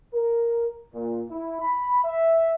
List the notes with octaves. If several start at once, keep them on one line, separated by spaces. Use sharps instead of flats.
A#4
A#2
E4
B5
E5